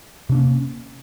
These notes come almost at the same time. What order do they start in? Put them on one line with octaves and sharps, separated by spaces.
C3 D4 A#3 C#4